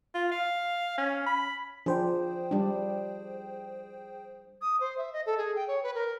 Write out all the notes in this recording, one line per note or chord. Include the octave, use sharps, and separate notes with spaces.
F4
F5
C#4
B5
F3 D4 G#4 C5 G5
G3 D4
D#6
C5
E5
D#5
A4
G#4
G5
C#5
B4
A#4